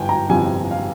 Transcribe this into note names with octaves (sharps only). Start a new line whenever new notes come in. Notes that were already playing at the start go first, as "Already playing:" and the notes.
Already playing: G1 G5 G#5
A#5
G1 F2 C3 G#5
F5